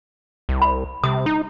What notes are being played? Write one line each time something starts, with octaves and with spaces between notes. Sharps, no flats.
C2
B5
C3 D#6
D#4